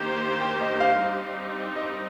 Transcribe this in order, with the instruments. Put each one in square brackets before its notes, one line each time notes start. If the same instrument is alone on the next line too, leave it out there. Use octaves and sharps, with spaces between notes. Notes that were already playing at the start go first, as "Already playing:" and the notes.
Already playing: [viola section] D#3 A#3 G4 C5 [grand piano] A#5
[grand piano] G5
D#5
F5
[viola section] G3 C4 D#4 G4
[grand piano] D#5